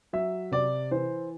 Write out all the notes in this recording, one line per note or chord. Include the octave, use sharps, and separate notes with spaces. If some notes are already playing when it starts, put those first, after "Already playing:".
F#3 E5
C3 D5
E3 C5